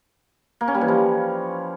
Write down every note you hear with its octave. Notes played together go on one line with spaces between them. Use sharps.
A#3
C#4
G3
E3
F3